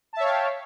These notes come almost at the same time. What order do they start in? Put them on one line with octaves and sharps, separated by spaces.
A5 E5 C#5 F5 G5